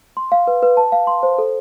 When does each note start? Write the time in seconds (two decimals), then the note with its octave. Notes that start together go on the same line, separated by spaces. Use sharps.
0.17 C6
0.32 F5
0.47 B4
0.63 B4
0.77 A5
0.92 F5
1.07 C6
1.23 C5
1.38 A4